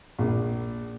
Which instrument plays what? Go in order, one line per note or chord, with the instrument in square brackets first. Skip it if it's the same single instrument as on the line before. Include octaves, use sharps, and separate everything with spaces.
[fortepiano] A#1